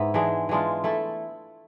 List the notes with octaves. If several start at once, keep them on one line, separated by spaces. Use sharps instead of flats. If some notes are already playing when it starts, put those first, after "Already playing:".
Already playing: G#2 B3 E4
E3 G#3 D4
E3 G#3 D4 F4
A3 E4 A4